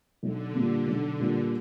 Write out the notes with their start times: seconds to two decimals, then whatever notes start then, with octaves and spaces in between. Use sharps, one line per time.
0.22 B1 D3
0.54 A#2 G3 A#3
0.87 B1
1.20 A#2 G3 A#3